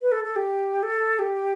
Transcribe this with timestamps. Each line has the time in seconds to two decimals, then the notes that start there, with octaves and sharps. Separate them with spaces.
0.02 B4
0.12 A4
0.24 A4
0.36 G4
0.83 A4
1.19 G4